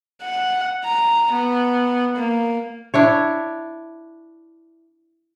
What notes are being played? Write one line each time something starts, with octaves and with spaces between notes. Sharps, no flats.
F#5
A#5
B3
A#3
D4 E4 C#5